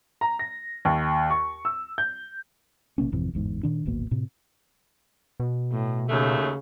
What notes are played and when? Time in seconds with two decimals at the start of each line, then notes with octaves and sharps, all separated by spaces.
0.21 A#5
0.39 A#6
0.85 D#2
1.31 C#6
1.65 E6
1.98 G6
2.98 A#1 C3 A#3 C#4
3.12 G#1 F2 C3 E3
3.33 G1 E2 G#2
3.63 A#2 D#3 D4
3.86 D1 G#1 B2 A#3
4.11 A2 C3
5.40 B2
5.71 A2
6.10 D#2 C#3 F#3 A3